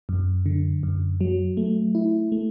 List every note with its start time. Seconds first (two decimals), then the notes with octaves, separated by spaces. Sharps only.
0.09 F#2
0.46 D3
0.83 F#2
1.21 F#3
1.57 A3
1.95 E4
2.32 A3